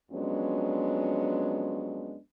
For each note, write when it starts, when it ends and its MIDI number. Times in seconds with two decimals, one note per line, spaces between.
0.11 2.16 41
0.11 2.16 54
0.11 2.16 56
0.11 2.16 59
0.11 2.16 61
0.11 2.16 62